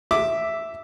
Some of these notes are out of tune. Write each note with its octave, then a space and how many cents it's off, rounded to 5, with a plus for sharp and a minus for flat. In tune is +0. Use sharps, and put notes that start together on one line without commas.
E5 +0 D6 +0